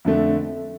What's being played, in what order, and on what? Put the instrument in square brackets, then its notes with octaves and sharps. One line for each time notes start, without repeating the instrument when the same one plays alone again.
[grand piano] F2 D3 A3